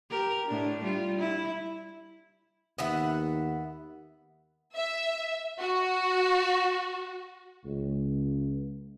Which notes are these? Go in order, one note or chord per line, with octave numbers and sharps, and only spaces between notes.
G4 A#4
A2 D4
G3 F4
E4
D#2 B3 E5 F#5
E5
F#4
C#2